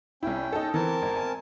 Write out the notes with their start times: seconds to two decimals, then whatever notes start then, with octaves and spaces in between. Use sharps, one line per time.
0.23 C2 C#4 E4 G5
0.52 D#4 A4
0.74 E3 C4 A#4 A5
1.02 G#1
1.17 G#5